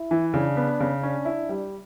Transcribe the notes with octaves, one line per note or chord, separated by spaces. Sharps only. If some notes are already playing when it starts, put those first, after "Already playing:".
Already playing: E4
E3
C#3 D4
B3
C#3
C#4 D4
E4
G3